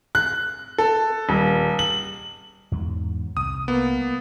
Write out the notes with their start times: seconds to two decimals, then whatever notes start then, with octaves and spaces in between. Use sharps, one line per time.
0.15 F#6
0.78 A4
1.29 D#1
1.79 F#7
2.72 E2 G#2 F#3
3.37 C2 D#6
3.68 A#3 B3